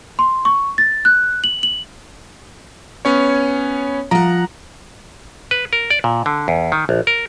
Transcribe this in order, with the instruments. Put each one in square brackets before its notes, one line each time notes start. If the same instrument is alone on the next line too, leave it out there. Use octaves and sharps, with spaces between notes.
[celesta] C6
C#6
A6
F#6
F#7
F#7
[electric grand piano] B3 C#4 C#5
[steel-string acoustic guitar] F3 F#5 [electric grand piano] A#5
[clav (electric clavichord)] B4
A#4
D5
A#2
D3
E2
D#3
A#1
A#4